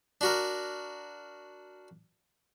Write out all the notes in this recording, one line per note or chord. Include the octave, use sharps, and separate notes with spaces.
D4 F#4 A#4